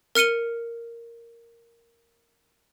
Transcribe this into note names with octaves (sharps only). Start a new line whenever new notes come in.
A#4 F6 C#7 D#7 G7